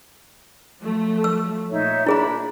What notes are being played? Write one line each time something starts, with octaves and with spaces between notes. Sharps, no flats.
F3 F#3 A3
E6
A#2 D#4 C#5 E5
D4 E4 G#4 A#5 B5